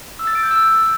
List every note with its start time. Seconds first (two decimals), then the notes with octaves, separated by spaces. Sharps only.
0.19 E6
0.27 A6
0.35 D7
0.43 G6
0.51 E6